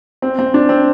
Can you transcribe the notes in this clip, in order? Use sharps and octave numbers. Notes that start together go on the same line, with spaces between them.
C4
C4
D4
C4